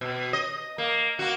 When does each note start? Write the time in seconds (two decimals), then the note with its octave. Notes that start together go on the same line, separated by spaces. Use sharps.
0.01 B2
0.33 D#5
0.78 A#3
1.19 A#3 F#4